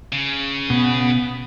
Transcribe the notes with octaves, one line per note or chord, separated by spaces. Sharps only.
C#3
B2 B3